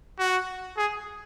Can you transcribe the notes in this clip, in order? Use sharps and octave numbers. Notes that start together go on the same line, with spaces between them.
F#4
G#4